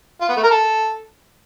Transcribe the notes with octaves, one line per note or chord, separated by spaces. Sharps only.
F4
B3
A3
A#4
A4